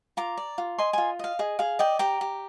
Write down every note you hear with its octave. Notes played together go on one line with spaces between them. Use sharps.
F4 A#5 D6
D5
F4
D#5 G#5 C6
F4 G#5 C6
D#5 F5
G#4 D#5
G#4 F5
D5 D#5 G5
G4 G5 A#5
G4